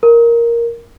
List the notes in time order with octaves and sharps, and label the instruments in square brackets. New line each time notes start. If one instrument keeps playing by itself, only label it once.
[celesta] A#4